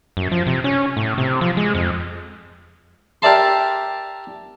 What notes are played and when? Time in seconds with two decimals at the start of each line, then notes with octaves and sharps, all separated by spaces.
0.17 F#2
0.32 F3
0.47 C3
0.64 C#4
0.97 A2
1.18 C3
1.41 F3
1.57 G#3
1.75 F2
3.22 G4 A#4 D5 E5 A5 C6